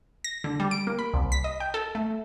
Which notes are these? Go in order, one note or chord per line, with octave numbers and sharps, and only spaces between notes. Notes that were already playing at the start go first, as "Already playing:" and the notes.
A#6
D3
G3
D7
A#3
B5
C2
B6
D#5
G5
A4
A3